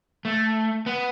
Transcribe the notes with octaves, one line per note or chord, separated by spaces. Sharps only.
A3
B3